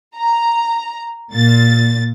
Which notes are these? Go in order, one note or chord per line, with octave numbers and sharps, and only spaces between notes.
A#5
A#2 A6